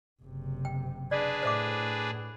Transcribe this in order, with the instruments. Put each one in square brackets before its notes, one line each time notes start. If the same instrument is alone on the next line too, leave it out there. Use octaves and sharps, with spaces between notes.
[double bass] F#1 C3
[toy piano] G5
[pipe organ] D4 G#4 B4 [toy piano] D5
[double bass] A2 [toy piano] C5 E5 D6